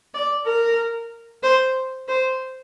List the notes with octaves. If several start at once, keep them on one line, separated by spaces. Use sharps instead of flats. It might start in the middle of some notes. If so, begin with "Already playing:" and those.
D5
A#4
C5
C5